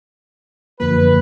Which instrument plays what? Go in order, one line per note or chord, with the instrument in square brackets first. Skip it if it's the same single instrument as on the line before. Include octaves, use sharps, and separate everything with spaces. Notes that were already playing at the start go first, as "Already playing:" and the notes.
[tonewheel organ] F#2 D3 F3 A#3 [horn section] B4